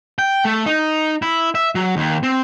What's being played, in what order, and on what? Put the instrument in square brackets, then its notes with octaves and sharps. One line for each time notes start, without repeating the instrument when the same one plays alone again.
[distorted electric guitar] G5
A3
D#4
E4
E5
F#3
D#2
C4